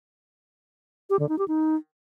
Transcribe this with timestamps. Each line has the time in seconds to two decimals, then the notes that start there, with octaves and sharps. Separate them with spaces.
1.10 G4
1.19 D3
1.29 D#4
1.39 G4
1.48 D#4